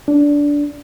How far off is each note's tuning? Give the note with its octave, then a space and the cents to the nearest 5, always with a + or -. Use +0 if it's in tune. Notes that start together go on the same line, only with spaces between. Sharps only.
D4 -15